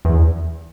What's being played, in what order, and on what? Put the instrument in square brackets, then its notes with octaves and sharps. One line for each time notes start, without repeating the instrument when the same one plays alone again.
[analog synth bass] E2